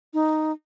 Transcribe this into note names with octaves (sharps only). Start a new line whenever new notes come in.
D#4